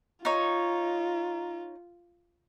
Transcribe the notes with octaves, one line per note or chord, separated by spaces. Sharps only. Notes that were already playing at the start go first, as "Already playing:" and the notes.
D#4 F4 C#5